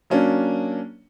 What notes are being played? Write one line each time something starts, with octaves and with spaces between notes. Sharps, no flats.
F#3 A#3 C#4 D4